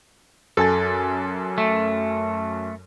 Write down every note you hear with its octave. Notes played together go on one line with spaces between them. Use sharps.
F#2 A4 G#5 A6
A3